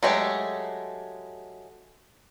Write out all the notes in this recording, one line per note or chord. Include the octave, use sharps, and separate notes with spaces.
F#3 G#3 A3 G4